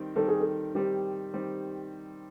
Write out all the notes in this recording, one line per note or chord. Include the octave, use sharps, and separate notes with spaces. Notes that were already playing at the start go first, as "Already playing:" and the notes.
Already playing: D#3 G3 C4
D#3 G3 C4 A4
G#4
A4
D#3 G3 C4 G4
D#3 G3 C4